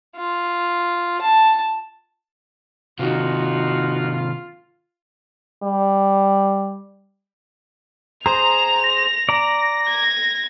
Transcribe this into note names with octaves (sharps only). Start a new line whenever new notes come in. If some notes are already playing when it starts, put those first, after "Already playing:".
F4
A5
C3 D#3 D#4 F4 F#4
G3
G#4 C5 A#5 F7
A#6
D5 A#5
G#6